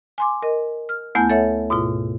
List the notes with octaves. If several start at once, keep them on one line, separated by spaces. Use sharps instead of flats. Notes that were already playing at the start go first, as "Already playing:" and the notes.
G#5 C6 D6
A#4 D#5
F6
D2 A3 B3 E4 G#5 G6
A4 C#5 E5 F#5
G#2 B2 E4 F4